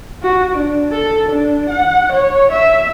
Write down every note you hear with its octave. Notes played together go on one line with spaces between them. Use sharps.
F#4
D4
A4
D4
F#5
C#5
E5